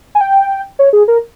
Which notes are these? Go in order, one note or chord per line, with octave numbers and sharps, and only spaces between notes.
G#5
G5
C#5
G#4
A#4